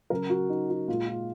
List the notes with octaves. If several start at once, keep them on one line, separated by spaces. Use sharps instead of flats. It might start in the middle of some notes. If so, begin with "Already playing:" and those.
C#3 F#3 A#4
F#4
D#4
F#4
A#2 G#3 F4
F4